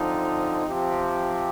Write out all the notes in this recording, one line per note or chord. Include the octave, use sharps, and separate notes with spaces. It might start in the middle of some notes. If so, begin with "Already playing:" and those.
Already playing: D3 F3 C4 D#4
C3 F3 C4 G4